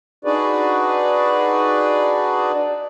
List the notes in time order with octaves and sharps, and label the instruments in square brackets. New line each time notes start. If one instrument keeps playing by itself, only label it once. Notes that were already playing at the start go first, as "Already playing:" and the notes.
[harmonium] D4 D#4 F#4 G#4 B4 D5